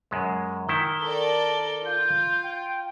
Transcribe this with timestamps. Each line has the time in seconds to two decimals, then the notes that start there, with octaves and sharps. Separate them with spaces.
0.11 F#2 G#3
0.69 D#3 E4 G7
1.02 A4 A#4 D5
1.85 F4 G6
2.43 G5